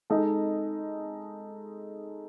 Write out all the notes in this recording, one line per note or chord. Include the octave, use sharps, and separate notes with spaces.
G#3 D#4 A4 D#5